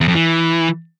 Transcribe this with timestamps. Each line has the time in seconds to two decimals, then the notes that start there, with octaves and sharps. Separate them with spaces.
0.01 E2
0.08 F2
0.15 E3